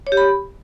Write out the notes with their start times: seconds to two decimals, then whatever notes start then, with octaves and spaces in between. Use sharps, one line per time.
0.07 C#5
0.12 G4
0.17 B5